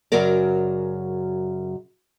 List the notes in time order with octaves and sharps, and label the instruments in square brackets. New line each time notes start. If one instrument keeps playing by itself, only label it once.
[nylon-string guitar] F#2 C#3 F#3 F#4 A#4 D5